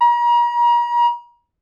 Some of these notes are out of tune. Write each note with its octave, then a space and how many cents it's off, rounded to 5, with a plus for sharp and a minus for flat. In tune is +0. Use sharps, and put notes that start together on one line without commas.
A#5 +40